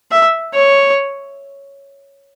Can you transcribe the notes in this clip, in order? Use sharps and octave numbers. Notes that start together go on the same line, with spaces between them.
E5
C#5